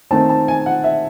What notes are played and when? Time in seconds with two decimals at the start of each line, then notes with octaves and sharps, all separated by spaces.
0.11 D#3 A3 C4 A5
0.29 A5
0.48 G#5
0.66 F#5
0.84 E5